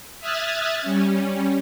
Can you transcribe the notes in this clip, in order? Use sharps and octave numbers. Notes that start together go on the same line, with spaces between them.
E5 D#6 F6 F#6 G#6 A6
G3 C#4